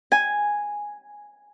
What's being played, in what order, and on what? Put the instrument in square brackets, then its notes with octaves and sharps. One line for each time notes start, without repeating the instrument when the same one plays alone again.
[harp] G#5